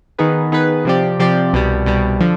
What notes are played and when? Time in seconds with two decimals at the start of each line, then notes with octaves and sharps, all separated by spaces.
0.18 D#3 B3 D#4 G#4 B4
0.52 D#3 B3 D#4 G#4 B4
0.85 C3 F3 C4 G4 D5
1.19 C3 F3 C4 G4 D5
1.53 C2 B2 G3
1.86 C2 B2 G3
2.20 D3 F3